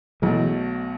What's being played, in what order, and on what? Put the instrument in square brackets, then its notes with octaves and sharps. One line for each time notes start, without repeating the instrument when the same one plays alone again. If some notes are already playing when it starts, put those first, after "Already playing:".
[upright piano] B1 B2 A3 [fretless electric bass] E3 G#3